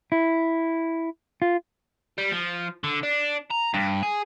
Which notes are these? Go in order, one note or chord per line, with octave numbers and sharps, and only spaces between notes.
E4
F4
G3
F3
D3
D4
A#5
G2
G#4